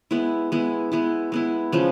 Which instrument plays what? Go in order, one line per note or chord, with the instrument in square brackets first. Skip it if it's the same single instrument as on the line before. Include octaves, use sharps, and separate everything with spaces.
[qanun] G#3 B3 E4
G#3 B3 E4
G#3 B3 E4
G#3 B3 E4
C#3 F3 G#3